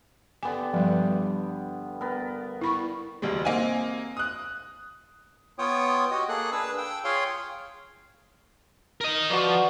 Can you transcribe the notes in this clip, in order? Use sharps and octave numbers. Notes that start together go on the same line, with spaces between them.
D3 B3 G4 G#5
G2 F3 G3
B3 A#4
E4 B5 C#6
E1 D2 G3 G#3
A#3 C4 D#4 G#5
D#6 F#6
B3 F4 C#5 G5 D#6
F#4 G4 D#5
A#3 G#4 A4 F#6
D4 G#4 B4 E6
G5 E6
F4 G#4 C#5 F5 G5 C6
A#4 D#5
F3 F#4 B4 D5